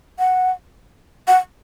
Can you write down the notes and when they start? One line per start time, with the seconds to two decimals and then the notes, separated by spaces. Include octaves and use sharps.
0.19 F#5
1.28 F#5